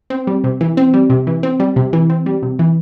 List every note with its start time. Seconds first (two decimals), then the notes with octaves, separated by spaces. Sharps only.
0.10 C4
0.27 G3
0.44 C3
0.61 E3
0.77 C4
0.94 G3
1.10 C3
1.27 E3
1.43 C4
1.60 G3
1.76 C3
1.93 E3
2.10 C4
2.26 G3
2.43 C3
2.59 E3